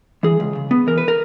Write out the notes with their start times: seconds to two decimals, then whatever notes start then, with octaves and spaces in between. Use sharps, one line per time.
0.23 E3 G#4
0.40 C#2
0.55 C#3
0.71 B3
0.87 E3 A#4
0.98 B4
1.08 A#4